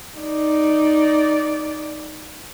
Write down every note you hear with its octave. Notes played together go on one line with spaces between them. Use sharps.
D#4 D5